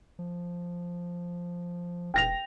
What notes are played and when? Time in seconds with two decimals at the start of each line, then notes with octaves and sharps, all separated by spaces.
0.19 F3
2.14 E1 G5 A#6 F7